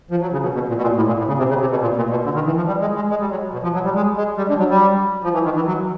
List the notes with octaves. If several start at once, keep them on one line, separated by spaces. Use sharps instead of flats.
F3
F#3
C#3
B2
B2
A#2
B2
A#2
A2
A#2
A2
C#3
C3
C#3
C3
B2
A#2
A#2
B2
D3
D#3
E3
F3
G3
G#3
G#3
G#3
G3
F#3
B2
F3
F#3
G3
G#3
G#3
G3
D3
F#3
G3
F3
E3
D#3
E3
F#3